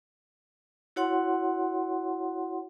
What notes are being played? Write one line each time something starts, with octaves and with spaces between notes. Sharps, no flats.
E4 F#4 C#5 F#5 C6